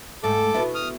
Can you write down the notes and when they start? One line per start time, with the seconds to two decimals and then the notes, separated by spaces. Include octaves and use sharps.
0.23 G#2 A3 A4 D6
0.54 B2 B3 E4
0.75 D#6 F6